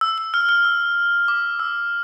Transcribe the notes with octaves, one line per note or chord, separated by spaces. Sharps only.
E6
E6
F6
F6
E6
D6
E6